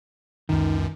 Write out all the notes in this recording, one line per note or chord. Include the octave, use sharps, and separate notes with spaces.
C#2 F#2 D#3